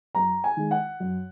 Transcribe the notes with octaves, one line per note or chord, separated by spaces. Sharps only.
F#2 A#5
G#5
D#3 G#3
F#5
F#2